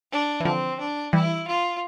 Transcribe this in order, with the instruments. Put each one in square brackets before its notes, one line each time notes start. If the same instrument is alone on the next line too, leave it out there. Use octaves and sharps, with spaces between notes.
[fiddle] D4
[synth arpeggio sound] E3
[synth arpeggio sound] D3 F3 [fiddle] C4
[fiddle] D4
[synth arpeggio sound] E3 G3 [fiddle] E4
[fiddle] F4